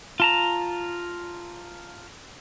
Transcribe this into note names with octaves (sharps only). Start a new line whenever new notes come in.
F4 A5 A#5